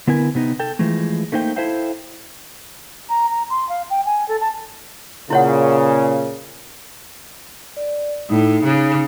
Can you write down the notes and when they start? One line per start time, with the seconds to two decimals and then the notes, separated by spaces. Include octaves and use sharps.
0.07 D3 B3 E4 A#4 G#5
0.35 C3 B3 D#4
0.60 A4 G5
0.79 E3 F3 G#3 A3
1.32 A3 A#3 D#4 C5 G5
1.56 E4 A4 C5 E5 F5 G5
3.09 A#5
3.30 A#5
3.50 C6
3.69 F5
3.90 G5
4.06 G#5
4.28 A4
4.41 A5
5.30 A#2 C#3 E4 C#5 F#5
7.77 D5
8.30 A2 D#4
8.64 C#3